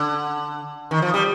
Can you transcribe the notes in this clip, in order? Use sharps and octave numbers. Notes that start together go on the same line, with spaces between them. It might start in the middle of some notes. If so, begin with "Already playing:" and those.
Already playing: D3
D#3
F3
G3